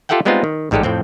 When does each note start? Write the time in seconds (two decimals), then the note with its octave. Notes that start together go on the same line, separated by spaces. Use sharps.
0.09 F4 G4 A4 E5 F#5 G5
0.25 G3 G#3 B3 C4 D#4 F4
0.44 D#3
0.71 A1 G#2 G3 G#3 G4 A4
0.83 F2 A2 C4 G5